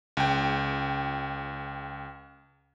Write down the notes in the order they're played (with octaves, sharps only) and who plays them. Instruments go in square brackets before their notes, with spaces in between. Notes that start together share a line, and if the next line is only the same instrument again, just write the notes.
[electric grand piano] C#2 G5